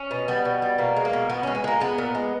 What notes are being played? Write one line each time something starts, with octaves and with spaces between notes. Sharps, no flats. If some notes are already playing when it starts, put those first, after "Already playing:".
Already playing: C#4
B2
G3 B3
B2
G3
B2 A#3
G#3
A#3
B2
B2 B3
G#3 C#4
B3
G#3 A#3
G#3 B3
A#2
G#3